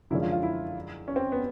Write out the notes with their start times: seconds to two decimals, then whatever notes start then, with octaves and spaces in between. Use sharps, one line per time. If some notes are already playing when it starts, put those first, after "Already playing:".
0.10 F#2 D3 F3 G#3 C#4 E4
0.22 F4
0.32 F4
0.43 E4
1.08 C#4
1.16 C4
1.32 B3